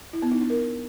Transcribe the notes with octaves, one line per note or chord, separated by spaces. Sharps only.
E4
B3
D#4
D4
A#4